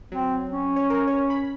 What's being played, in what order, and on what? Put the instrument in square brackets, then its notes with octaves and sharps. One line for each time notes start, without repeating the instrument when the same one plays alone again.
[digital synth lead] F#3 [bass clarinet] C4
[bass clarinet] C#4
[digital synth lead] C#5
A#4
C#5
B5